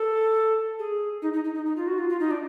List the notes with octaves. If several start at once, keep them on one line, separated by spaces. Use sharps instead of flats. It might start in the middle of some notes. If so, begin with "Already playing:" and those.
Already playing: A4
G#4
D#4
D#4
D#4
D#4
D#4
F4
F#4
F4
F4
D#4
D4